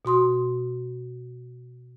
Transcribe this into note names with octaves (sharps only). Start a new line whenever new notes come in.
B2 F#4 C6 D#6